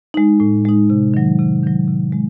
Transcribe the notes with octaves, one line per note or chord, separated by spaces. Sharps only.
G#3 D#4
A2
G#3 D#4
C3
D#3 F#3
C3
D#3 F#3
C3
G#3